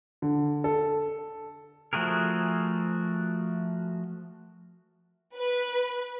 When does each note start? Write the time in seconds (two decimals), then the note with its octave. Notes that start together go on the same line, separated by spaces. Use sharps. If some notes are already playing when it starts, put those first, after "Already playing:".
0.22 D3
0.64 A4
1.93 F3 A3 F#4 G#4 A#4
5.36 B4